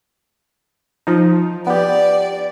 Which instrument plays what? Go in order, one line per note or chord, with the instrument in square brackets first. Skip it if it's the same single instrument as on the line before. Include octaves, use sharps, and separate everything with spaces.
[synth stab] F3 D#4
[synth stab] B3 G4 [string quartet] D5